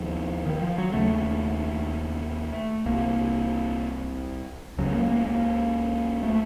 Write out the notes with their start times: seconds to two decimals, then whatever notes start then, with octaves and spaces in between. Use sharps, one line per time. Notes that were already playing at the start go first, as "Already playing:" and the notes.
Already playing: D#2 C#3 F3
0.46 D#3
0.62 F3
0.78 F#3
0.93 D#2 C#3 A3
2.86 C2 C3 A#3
4.78 C#2 C#3 F#3
4.94 A#3
5.11 A#3
5.26 A#3
6.23 A3